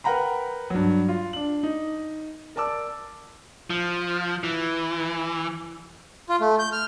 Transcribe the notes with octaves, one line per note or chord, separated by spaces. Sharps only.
A#4 B4 F#5 G5 A#5 B5
G2 F#3
F4
D4 F#7
D#4
A#4 D5 A5 D6 E6
F3
E3
F4
A3
G6
F6